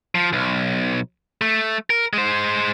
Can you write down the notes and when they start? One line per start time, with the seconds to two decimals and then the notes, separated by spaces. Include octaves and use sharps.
0.15 F3
0.33 B1
1.41 A3
1.90 A#4
2.13 G#3 C5